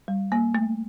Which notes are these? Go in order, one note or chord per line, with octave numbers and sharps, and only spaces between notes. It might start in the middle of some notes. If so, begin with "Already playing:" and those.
G3
A#3
A3